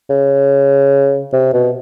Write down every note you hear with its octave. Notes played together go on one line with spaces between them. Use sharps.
C#3
C3
B2